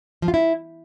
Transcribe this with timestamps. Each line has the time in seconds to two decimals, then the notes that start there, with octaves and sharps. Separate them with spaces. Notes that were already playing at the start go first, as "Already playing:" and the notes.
0.22 F3
0.28 F4
0.34 E4